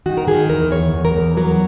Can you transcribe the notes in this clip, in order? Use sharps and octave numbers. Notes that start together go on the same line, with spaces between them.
D#3 F#4
A#4
D#3 G#4
E2 A#4
E2 C#5
E2
A#4
E2
F#3 A#4